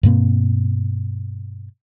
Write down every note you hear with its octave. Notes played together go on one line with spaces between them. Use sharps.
G2 B2 A#3 C4